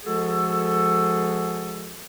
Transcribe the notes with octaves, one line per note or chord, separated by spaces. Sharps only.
F3 G#3 F#4 G#4 A4